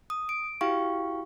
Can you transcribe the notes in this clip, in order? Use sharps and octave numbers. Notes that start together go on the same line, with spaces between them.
D#6
D7
E4 F#4 G4 F5 G5 C#6